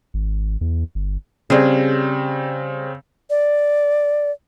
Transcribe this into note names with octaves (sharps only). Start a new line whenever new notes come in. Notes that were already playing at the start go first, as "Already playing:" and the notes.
G#1
E2
G1
C#3 G3 C4 G#4
D5